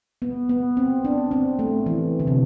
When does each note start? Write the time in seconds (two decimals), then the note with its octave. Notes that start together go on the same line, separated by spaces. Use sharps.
0.22 B3
0.49 B3
0.77 C4
1.05 D4
1.31 C4
1.59 A3
1.86 E3
2.20 D3
2.27 C3